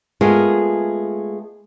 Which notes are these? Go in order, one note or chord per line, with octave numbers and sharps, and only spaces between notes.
G#3 A3 B3 F4 G#4 A#4